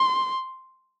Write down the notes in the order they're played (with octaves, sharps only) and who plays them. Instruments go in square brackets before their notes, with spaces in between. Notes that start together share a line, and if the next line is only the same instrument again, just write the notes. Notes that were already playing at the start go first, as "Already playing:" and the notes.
Already playing: [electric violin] C6